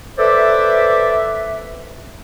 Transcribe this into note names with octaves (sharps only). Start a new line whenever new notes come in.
A4 B4 C5 D5 E5